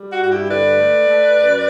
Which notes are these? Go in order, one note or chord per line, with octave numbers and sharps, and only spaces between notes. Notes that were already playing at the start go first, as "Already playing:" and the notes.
Already playing: G3
F#4
G2 F#4
E4 G4
D3 B4 D5
A3
A3
F#2